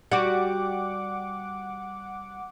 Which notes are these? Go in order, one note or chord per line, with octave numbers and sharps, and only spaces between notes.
G3 F#4 F#5 D6